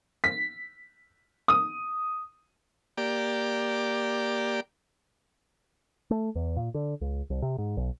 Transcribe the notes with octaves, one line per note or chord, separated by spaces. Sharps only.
B6
D#6
A#3 G4 D5
A3
E2
A#2
D3
C#2
C2
C3
G#2
B1